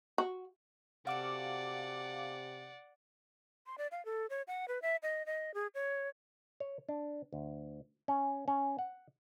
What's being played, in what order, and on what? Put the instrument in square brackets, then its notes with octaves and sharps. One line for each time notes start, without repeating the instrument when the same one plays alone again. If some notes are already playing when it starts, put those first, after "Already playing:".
[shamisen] F#4
[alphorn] C3 [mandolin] F#4 A4 [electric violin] D5 F#5 [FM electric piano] F5 D6
[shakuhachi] C6
D5
F5
A4
C#5
F#5
B4
E5
D#5
D#5
G#4
C#5
[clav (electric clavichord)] C#5
D4
D2
C#4
C#4
F#5